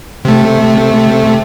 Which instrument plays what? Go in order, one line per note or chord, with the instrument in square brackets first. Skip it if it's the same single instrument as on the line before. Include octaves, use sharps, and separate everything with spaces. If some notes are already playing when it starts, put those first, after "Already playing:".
[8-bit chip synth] C3 A3